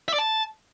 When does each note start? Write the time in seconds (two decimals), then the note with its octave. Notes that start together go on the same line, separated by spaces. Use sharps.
0.08 E5
0.13 D5
0.19 A5